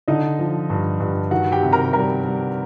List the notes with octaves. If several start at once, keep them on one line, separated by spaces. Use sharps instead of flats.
D3 D#4 D#5
F3
G2
G2
D#3 F#4 F#5
G4 G5
C3
A#4 A#5
G3 A#4 A#5
G3